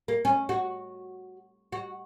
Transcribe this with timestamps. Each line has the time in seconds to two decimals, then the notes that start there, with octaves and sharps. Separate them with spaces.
0.08 A#3
0.25 C#4
0.49 F#4
1.72 F#4